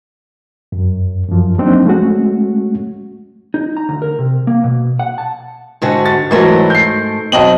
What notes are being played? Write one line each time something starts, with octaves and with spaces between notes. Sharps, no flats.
F#2
F#2 F3
F3 F#3 A#3 C4 D4 D#4
G#3 A3 C#4 F#4
D#4
A#5
D2
A#4
C3
A#3
B2
F#5
A5
G#2 D3 F#4
A6
G#2 E3 F#3 A3 A#4
G6 C7
B1 C4 D#5 F#7